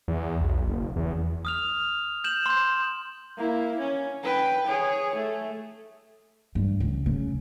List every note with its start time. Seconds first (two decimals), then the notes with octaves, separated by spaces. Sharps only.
0.08 E2
0.41 B1
0.68 F#1
0.96 E2
1.45 D#6 F6 F7
2.24 G6 E7 F#7
2.46 C6 G6
3.37 A#3 E4
3.79 C#4
4.24 B4 G5
4.67 G#4 C#5
5.15 A3
6.55 G2
6.80 C#2
7.06 C#3